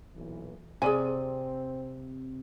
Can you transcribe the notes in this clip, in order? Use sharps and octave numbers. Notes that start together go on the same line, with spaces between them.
B1 A#2 E3
C3 C4 G#4 D5 G#5